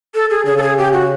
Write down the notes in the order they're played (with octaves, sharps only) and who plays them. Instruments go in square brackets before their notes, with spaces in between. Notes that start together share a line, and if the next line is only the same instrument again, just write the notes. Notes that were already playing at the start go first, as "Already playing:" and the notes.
[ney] A4
G#4
[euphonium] C#3 [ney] G#4
[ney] A4
G#4
G4
F#4